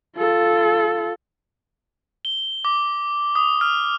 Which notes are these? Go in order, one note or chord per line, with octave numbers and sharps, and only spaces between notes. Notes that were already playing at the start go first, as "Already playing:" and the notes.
F4 A4
G7
D6
D#6
F6